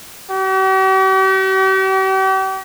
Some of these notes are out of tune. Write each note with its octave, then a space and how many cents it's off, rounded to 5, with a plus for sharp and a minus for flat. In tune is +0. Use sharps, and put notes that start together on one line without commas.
G4 -45